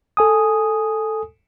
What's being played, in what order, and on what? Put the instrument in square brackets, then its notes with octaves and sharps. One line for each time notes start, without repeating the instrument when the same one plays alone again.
[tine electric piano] A4 G#5 D#6